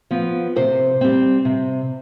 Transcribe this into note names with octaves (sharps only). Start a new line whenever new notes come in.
F3 B3
C3 C5
G3 C4
C3